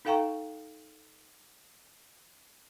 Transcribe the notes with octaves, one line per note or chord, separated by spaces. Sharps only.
D#4 A4 F5 G5 A#5 C#6